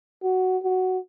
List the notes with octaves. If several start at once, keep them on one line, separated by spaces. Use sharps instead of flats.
F#4
F#4